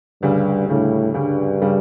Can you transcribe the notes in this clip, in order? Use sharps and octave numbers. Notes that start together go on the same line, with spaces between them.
D2 G2 C#3 G3
D2 A2 C#3 G3
D2 G2 C#3 G3
C#3 G3